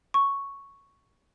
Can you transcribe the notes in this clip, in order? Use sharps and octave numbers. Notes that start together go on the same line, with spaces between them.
C#6